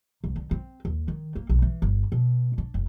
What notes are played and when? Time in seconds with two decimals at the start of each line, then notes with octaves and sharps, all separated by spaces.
0.24 C2
0.36 D3
0.51 C4
0.85 D#2
1.08 D#3
1.36 A#3
1.49 B1
1.62 E3
1.82 G1
2.12 B2
2.58 D4
2.74 F1